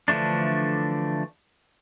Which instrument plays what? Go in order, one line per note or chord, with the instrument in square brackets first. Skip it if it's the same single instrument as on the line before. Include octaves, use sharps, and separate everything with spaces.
[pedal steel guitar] D3 E3 F3 A3 D4